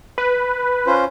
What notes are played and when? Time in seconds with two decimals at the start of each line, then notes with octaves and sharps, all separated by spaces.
0.18 B4
0.87 C#4 F4 C5